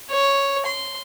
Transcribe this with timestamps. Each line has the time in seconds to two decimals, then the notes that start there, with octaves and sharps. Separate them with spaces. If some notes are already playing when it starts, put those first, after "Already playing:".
0.11 C#5
0.66 C6